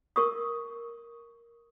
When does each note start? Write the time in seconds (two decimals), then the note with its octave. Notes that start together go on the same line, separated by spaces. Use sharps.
0.16 A#4 C#6 D#6